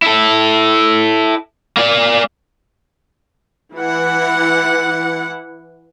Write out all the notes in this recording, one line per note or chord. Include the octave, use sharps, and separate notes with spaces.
E4 A4
A#3 D5
E3 E4 F#5